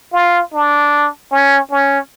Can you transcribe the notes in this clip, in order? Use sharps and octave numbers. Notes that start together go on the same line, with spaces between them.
F4
D4
C#4
C#4